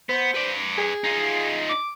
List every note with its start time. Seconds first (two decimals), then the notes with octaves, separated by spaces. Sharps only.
0.09 B3 C5
0.35 B4 D5
0.78 G#4
1.04 D#4 F4
1.69 D6